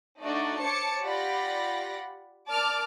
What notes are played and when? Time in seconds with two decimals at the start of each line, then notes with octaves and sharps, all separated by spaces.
0.22 A3 D4 D#4 F#4 D5
0.61 C5 C#5 A5 D6 C#7
1.04 F4 G4 D5 F#5 B5 A#6
2.50 A#4 D5 A5 D6 F6 D7